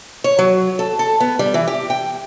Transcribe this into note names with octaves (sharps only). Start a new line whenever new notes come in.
C#5
F#3
A4
A4
B3
G3
E3
G4
G5